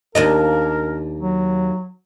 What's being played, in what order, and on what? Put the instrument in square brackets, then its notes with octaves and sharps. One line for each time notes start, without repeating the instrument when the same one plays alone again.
[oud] D#2 D4 D#5 [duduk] A#4
[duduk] F#3